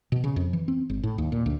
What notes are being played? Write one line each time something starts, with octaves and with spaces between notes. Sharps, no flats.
B2
C#3
F2
E3
C4
G#1
A2
D#2
A#2
D2